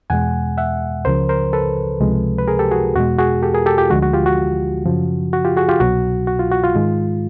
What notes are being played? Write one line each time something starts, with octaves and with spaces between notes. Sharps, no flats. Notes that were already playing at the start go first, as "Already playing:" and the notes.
E2 B2 G#3 F#5 G#5
E5 F#5
C#2 C#3 F3 A#4 C5
A#4 C5
A4 B4
C#2 C3 F3 G#3
B4
G#4 A#4
G4 A4
F#4 G#4
E2 B2 G#3 F#4
F#4 G#4
G4 A4
G#4 A#4
G4 A4
F4 G4
D2 D3 F3 G#3 F#4
F#4
F4 G4
F#4
F#2 C#3 F3
F#4
F4 G4
F#4 G#4
F4 G4
C2 B2 F#3 F#4
F#4
F4
F#4
F4
G#2 D#3 G#3